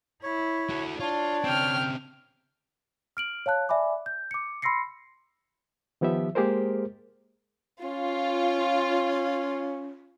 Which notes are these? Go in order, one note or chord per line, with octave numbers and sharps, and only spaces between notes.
E4 C#5
F#4 A4
D4 F4 C#5
C#3 C4 G5 F6
F6 D7 F#7
C#5 F5 A5 F#6
D5 E5 G#5 B5 D6
G6
D6 C#7
B5 C6 E6 A#6 C7 C#7
D#3 F3 B3 G4 E5
G#3 A#3 G4 G#4 A#4 C5
C#4 F4